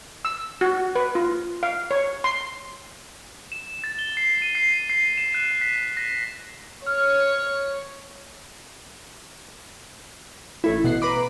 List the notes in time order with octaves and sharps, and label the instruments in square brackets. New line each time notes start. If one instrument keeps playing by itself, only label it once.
[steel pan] E6
F#4
B4
F4
F5
C#5
C6
[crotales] E7
A6
G7
C7
D#7
C7
C7
E7
F#6
B6
A#6
[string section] C#5 [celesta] F6
[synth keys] A1 A3 E4
B2 F#5 C7
B4 A#5 B5 D6